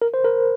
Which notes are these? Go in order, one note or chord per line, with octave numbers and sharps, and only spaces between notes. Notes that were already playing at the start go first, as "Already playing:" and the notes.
A#4
C5
A#4